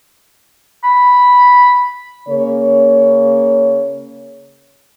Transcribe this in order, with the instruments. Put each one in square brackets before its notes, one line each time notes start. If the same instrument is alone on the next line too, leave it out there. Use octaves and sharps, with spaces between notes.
[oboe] B5
[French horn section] C#3 A#3 C#5